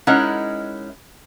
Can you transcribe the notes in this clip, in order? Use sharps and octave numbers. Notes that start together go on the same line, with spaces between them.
G#3 C#4 D#4 E4 A#4 F#5